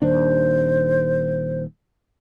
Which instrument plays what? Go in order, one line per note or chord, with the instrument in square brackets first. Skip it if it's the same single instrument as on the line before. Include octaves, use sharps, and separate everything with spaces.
[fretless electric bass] D#1 D#2 D4 [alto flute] C5